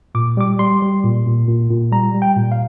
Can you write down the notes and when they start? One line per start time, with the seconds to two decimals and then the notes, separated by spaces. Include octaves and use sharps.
0.15 A#2 D6
0.37 G3 D6
0.59 G3 C6
0.82 G3
1.04 A#2
1.26 A#2
1.47 A#2
1.70 A#2
1.92 G3 A#5
2.14 G3
2.22 G5
2.36 A#2
2.52 F5